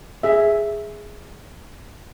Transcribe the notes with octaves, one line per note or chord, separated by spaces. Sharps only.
G#4 E5